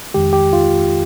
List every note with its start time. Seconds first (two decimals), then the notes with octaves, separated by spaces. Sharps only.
0.14 F2 D#3 G#3 G4
0.33 G4
0.53 F4